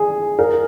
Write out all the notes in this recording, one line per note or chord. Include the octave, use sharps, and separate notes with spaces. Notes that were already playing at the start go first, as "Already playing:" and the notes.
Already playing: G#4
A#4